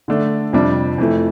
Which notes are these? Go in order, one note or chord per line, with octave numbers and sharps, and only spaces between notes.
D3 A3 D4
F2 C3 G3 D4
F2 E3 A3